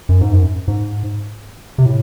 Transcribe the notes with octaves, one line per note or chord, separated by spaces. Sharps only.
F#2
G#2
F#2
G#2
C3
A2